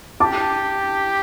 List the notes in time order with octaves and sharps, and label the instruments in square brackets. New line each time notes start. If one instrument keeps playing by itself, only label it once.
[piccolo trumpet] G4 [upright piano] A5 D6